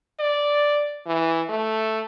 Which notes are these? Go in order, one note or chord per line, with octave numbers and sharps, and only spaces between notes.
D5
E3
A3